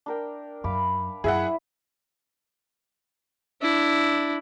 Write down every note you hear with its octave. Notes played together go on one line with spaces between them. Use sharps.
D4 A#4 G5
F#2 F5 B5 D6
F#2 E4 G#4 E5 F#5
D4 E4